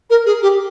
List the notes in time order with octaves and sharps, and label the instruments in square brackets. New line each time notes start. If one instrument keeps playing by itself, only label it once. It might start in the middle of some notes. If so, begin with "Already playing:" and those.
[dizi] A#4
G#4
G4